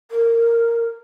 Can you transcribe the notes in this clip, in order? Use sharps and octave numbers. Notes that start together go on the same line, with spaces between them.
A#4